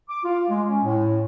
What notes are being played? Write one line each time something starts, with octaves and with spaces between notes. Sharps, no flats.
D6
F4
G#3
C#4
A2